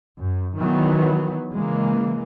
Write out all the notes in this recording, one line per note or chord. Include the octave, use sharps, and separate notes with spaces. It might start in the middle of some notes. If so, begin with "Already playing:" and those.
F#2
D#3 E3 F#3 B3
C#3 E3 G#3 A#3